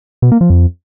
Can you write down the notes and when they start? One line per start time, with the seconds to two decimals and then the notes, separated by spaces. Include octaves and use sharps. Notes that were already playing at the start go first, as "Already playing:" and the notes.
0.22 B2
0.32 A#3
0.41 F3
0.50 F2